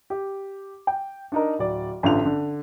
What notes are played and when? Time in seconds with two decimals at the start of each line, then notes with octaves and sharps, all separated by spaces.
0.10 G4
0.87 G5
1.32 D4 D#4 A#4
1.59 D1 D5
2.03 A1 D3 F4 F7
2.25 D3